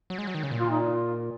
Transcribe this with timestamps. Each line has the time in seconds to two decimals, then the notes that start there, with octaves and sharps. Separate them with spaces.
0.10 F#3
0.18 G#3
0.27 F#3
0.34 D#3
0.43 C#3
0.51 A#2
0.60 F4
0.70 D#4
0.80 F4